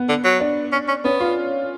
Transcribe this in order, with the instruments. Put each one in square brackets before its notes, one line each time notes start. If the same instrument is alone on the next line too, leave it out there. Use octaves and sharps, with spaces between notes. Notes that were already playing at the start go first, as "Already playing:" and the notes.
Already playing: [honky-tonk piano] B3
[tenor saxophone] D3
F#3
[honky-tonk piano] D4
[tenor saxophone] C#4
C#4
[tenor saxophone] B3 [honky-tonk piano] C#4
[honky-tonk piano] F4